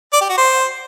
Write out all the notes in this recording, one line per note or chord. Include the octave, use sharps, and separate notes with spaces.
D5
G4
F#4
C5